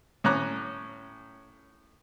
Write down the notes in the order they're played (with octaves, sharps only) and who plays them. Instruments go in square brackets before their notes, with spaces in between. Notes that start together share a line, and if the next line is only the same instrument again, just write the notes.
[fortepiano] A2 C#4 A#5 D6 F#6